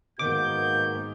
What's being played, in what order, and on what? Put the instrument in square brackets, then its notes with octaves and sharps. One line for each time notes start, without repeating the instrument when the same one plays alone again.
[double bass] G#2 D#3 [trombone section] A#3 B3 F#4 [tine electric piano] D6 [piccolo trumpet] G6